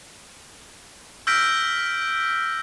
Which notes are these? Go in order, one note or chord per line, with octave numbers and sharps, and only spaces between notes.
E6 F6 G6 A#6 B6 D7